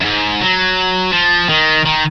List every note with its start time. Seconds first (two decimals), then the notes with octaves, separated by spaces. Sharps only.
0.01 F#2
0.05 G#2
0.41 F#3
1.12 F3
1.49 D#3
1.85 D#3